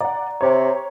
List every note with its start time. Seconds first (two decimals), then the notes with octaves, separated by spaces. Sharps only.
0.01 D5 F#5 A#5
0.41 C3 C#5